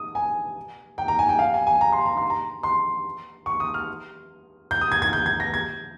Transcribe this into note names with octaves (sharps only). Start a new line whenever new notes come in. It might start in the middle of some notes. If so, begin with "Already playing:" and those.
Already playing: D#6
G#5
G5
A#5
G#5
G5
F5
G#5
G#5
A#5
C6
A#5
C6
A#5
C6
C#6
D#6
F6
G6
D#6
G#6
G#6
G6
G#6
A#6
G#6